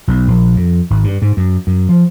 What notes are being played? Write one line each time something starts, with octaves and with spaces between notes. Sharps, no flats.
B1
A#1
F2
G#1
G2
G#2
F#2
F#2
F3